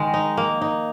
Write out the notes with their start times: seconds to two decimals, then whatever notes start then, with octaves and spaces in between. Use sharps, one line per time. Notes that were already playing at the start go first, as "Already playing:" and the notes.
Already playing: D#3 G#3
0.14 D#4
0.37 A#3
0.61 D#4